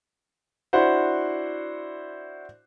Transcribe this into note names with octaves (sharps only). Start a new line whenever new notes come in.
D4 E4 F#4 C5 F#5